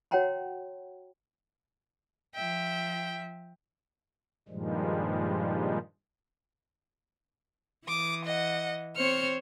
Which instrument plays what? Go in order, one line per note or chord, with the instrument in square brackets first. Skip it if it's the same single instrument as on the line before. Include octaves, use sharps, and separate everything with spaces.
[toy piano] F#4 C#5 F#5 G5 A#5 C6
[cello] F3 E5 [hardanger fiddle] G5
[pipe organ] G2 A#2 D#3 F3 G3 G#3
[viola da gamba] E3 [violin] D6 D#6
[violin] D#5 F#5
[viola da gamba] C4 C5 C#5 [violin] F6 C#7